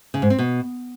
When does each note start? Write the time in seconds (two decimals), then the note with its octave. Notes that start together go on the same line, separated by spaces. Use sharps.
0.14 C#3
0.22 G#2
0.30 C4
0.39 B2